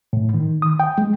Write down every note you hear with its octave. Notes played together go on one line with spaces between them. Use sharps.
A2
D#3
D#6
G5
G#3